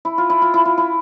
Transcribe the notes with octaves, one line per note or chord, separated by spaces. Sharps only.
E4
F4
E4
F4
E4
F4
E4